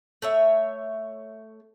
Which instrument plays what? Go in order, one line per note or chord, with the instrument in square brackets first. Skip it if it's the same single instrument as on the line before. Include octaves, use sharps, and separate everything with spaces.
[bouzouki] A3 C#5 E5